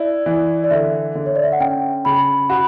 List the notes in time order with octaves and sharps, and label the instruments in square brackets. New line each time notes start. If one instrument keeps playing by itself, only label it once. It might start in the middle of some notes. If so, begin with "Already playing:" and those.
Already playing: [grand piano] E4 [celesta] D5
[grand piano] E3
[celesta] D5
[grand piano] D3 [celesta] E5
[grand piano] D3
[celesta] C#5
D5
E5
F#5
[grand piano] C#4 [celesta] G5
[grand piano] C#3 [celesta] B5
[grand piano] F#4 [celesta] B5